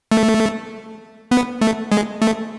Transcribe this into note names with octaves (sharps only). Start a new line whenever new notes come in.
A3
B3
A3
G#3
A3